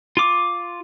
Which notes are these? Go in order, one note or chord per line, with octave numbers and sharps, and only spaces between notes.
F4 D6